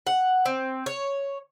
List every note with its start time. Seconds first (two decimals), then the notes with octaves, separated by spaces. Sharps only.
0.07 F#5
0.46 C4
0.86 C#5